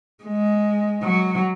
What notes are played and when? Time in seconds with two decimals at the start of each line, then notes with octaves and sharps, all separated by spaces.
0.24 G#3
1.04 F#3